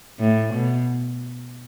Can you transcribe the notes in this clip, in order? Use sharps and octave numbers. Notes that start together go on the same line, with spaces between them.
A2
B2